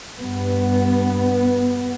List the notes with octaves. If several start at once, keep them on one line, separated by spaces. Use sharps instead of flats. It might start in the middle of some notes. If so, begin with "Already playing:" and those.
G2 B3